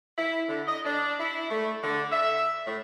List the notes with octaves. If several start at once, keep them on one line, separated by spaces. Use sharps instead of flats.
E4
D3
D#5
D4
E4
A3
D3
E5
A2